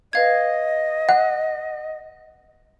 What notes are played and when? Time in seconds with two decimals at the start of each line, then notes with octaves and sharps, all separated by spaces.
0.13 B4 D#5 F5 G#6
1.09 F#5 F#6